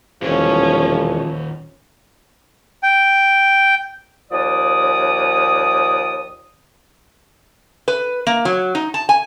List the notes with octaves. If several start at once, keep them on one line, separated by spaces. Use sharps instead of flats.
E1 D#2 A#2 F3 C#4
G5
D#2 F3 D5 D#6
B4
A#3
F#3
D#4
A5
G#5